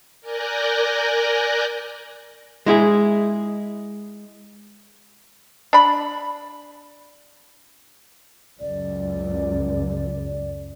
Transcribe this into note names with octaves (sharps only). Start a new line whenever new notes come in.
A#4 D5 G#5 F#6 G6 A#6
G#3 E4 G#4
D4 B5
C#2 F#2 D5